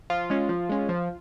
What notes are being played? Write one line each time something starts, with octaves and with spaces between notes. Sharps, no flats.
F3 F4
G#3 C#4
F3
G#3 C#4
F3